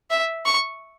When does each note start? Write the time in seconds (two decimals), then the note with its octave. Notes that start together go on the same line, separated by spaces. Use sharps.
0.10 E5
0.45 C#6